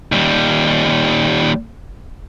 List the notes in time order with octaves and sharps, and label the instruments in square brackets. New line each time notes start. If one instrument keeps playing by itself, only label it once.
[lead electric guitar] D#2 G3